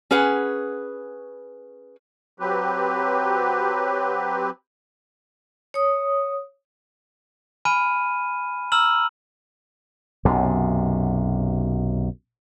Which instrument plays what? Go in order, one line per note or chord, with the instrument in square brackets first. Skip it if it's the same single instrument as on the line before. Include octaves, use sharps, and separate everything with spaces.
[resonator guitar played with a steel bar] C#4 G#4 B4 F#5
[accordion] F#3 C4 G4 B4
[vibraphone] C#5 D#6
[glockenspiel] G#5 B5 F6 D#7
A#5 E6 F6 F#7
[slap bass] B1 F#2 C3